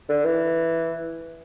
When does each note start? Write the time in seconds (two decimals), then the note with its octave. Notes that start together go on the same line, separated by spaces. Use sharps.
0.09 D3
0.25 E3